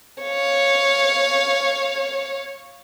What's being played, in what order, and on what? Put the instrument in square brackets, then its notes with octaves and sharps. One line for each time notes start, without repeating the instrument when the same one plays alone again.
[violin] C#5 F5